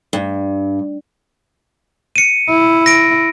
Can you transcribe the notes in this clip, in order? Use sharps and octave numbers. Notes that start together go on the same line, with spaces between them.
G2
C#7 D#7
E4
A#6 D7